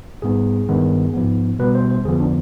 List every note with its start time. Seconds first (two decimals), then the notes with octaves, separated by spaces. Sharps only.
0.22 G#2 G3 B3 G#4
0.69 G2 D#3 G#3 B3
1.14 G#2 F3 B3
1.59 B2 G3 B3 B4
1.75 C5
1.90 C5
2.04 F2 D3 F3 B3 G#4
2.20 D4